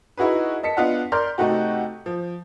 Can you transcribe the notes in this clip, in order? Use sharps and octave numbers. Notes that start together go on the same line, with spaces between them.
D#4 E4 F#4 G#4 B4
D#5 A5 B6 C#7
B3 D4 F4 D#5 F#5
A#4 D5 C6 F6 G6
C3 A3 D#4 F#4 G4
F3